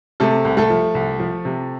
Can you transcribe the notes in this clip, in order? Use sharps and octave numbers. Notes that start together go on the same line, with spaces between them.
C3 A3 A4
C2
A3 A4
F3
C2
F3
C3